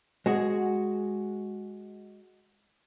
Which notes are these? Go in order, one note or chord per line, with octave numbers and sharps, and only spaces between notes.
G#3 F#4 G#4